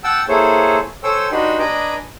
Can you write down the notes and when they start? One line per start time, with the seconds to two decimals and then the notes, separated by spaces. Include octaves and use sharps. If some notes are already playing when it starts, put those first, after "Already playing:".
0.04 F#5 G5 A5 E6
0.28 A#3 E4 G#4 A4 C5 C#5
1.03 A4 C5 C#5 G5 G#5 E6
1.31 D4 D#4 F#4 G4 B4 C6
1.59 D4 B4 D#5 G#5 A#5 D6